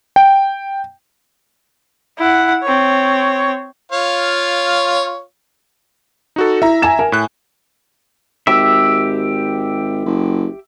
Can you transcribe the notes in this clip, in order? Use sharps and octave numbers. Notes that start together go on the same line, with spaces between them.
G5
E4 F#5
C4 C#5
F4 C#5 F5
D#4 F#4 A4
E4 E5 A#5
G#5 E7
A#4 G#5
A2 F#6
G#1 G4 E5 E6
F#1